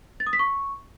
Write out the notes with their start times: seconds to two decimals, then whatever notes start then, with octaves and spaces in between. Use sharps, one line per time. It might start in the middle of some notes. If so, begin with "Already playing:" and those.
0.20 A6
0.27 D#6
0.33 B6
0.39 C#6